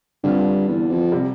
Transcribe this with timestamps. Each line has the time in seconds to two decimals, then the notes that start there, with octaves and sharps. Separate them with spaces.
0.24 G2 D3 G3 C4 F4
0.68 E2
0.90 F2
1.12 C3 G3